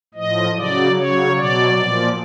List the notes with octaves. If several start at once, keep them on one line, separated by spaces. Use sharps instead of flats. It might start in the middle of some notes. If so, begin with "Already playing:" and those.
A2 F3 D#5
C#3 F#3 D5
C#3 F#3 C#5
B2 F#3 D5
A#2 F3